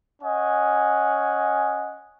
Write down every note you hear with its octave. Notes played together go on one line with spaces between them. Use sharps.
C#4 D#5 F#5 G#5